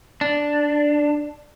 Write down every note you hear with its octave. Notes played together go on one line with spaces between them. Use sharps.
D4